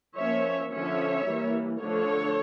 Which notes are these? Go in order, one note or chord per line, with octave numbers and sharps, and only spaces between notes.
F3 A#3 C#4 C#5 E5
D3 F3 C#4 C#5 E5
E3 G3 A#3
D3 F3 A3 D4 A4 C#5